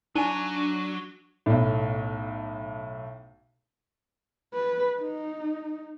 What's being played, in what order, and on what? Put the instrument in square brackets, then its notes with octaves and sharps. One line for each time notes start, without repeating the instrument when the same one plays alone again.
[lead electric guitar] F#3 [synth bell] D4 D#7 [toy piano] D#4 G#5
[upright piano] B1 A2
[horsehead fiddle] B4
D#4